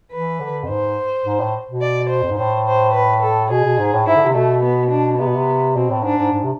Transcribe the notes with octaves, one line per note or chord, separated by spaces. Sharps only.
E3 B4
D3
F2
G#2 C5
G#2
A2
B2
D5
C5
F2
G#2
A2 C5
C5
B4
A4
B2 G#4
B2
G#2
A2
G#2 E4
D3
C3
B2 A3
B3
D4
C3 B3
B2
C3
B2 C4
A2
G#2 D4
G#2
G#2
C3